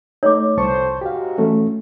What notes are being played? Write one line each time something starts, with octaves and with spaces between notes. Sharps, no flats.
A3 D#4 C#5 D6
C2 F2 B4 C5 A5 C#6
G#2 F#4 G4 F5
E3 A3 C#4